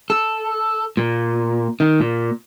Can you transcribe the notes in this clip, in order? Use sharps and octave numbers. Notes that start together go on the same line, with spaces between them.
A4
A#2
D#3
A#2